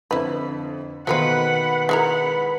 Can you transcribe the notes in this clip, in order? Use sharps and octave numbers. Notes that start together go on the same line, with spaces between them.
F2 D3 E4 B4
B2 D#3 A3 A#3 B4 C5 F#5 B5
G#3 E4 A#4 F#5